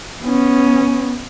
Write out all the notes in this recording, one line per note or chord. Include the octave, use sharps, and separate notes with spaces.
B3 C#4